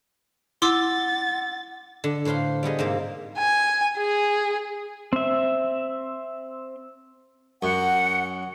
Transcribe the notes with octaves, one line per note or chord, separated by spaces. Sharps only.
E4 F#5 C6 D6 E6 A6
D3
A2 B4 C5 F5 C6
G3 B3 G#4 D#5
G#2 C3 A#3
G#5
G#4
C4 E5
F#2 F#5